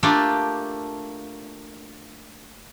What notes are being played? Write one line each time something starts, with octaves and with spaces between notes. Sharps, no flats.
A3 A#3 D4 F4 G4 A4